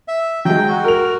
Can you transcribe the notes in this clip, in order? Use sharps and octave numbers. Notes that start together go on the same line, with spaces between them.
E5
F#3 G#3 G5
F#4
A#4 F7